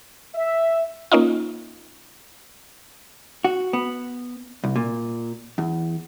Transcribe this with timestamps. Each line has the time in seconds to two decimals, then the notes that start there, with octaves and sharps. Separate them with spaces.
0.35 E5
1.12 A#3 C#4 D#4 F4
3.44 F#4
3.73 B3
4.64 C2
4.76 A#2
5.58 E2